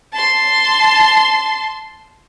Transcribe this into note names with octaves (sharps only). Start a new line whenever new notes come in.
A5 C6